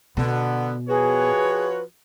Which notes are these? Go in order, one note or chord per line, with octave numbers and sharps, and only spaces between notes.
B2 D3 B3
F3 F#4 G#4 B4 C#5